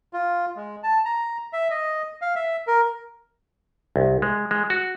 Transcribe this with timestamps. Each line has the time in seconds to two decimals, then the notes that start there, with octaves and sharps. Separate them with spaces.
0.13 F4
0.56 G#3
0.83 A5
1.05 A#5
1.53 E5
1.70 D#5
2.22 F5
2.36 E5
2.67 A#4
3.96 C2
4.22 G#3
4.51 G#3
4.70 F#4